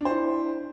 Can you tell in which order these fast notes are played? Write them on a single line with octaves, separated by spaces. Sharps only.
D4 C5 E4